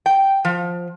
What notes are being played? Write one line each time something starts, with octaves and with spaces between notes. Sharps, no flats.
G5
F3